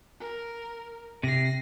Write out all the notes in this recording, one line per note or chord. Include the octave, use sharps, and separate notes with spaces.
A#4
C3 A#6 C7